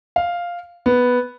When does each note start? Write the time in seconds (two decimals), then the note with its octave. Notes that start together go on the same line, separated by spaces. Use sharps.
0.16 F5
0.86 B3